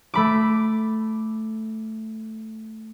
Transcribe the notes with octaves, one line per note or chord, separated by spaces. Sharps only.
A3 B5 D6